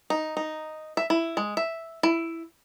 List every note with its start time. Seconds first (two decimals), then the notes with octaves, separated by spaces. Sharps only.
0.10 D#4
0.37 D#4
0.97 E5
1.10 E4
1.37 G#3
1.57 E5
2.03 E4